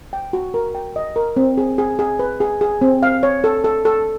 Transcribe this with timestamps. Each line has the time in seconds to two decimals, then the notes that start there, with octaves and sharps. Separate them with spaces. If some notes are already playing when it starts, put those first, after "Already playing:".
0.13 G5
0.33 F#4
0.54 A#4
0.75 G5
0.96 D#5
1.16 A#4
1.37 C4
1.58 G#4
1.78 G#4
1.99 G#4
2.19 B4
2.40 G#4
2.61 G#4
2.81 C4
3.03 F5
3.23 C#5
3.44 A4
3.64 A4
3.85 A4